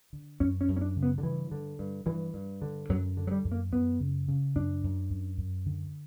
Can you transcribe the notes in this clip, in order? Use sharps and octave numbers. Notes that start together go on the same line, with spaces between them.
D3
F#2 C#4
C#4
F#2
C#4
D4
C#3
B3
D3
G2 E3
D3
G2
G2 E3
G2
D3
F#2 F#3
D3
F#3
G3
F#2
A#3
F#2 B3
C#3
C#3
F#2 D4
F#2
F#2
F#2
D3